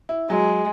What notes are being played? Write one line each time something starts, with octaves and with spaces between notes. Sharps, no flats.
E4
F#3 G#3